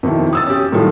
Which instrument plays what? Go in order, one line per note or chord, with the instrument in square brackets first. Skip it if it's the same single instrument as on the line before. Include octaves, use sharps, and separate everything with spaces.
[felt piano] F2 B2 D#3 E4
D#6 E6 A6
C#4 G4
A2 D#3 F#3 G3 F4 A4